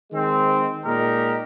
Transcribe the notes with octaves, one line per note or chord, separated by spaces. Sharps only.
D#3 G#3 C4
A#2 G#3 D#4 G4 A#4